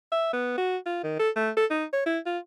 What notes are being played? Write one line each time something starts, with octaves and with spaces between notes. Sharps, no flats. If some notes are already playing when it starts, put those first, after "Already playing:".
E5
B3
F#4
F4
D#3
A4
A3
A4
D#4
C#5
E4
F4